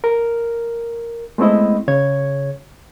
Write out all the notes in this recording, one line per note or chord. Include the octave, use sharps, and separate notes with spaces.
A#4
G#3 A3 B3 C4 E4 D#5
C#3 C#5 G#6